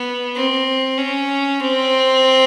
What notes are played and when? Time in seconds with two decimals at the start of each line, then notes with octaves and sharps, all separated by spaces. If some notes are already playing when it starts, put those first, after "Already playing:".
Already playing: B3
0.36 C4
0.98 C#4
1.60 C4